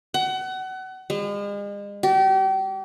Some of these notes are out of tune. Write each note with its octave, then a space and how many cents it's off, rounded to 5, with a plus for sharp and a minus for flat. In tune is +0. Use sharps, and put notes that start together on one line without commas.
F#5 +30
G#3 -40
G4 -35